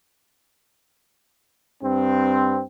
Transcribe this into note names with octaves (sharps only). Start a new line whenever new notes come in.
G2 C4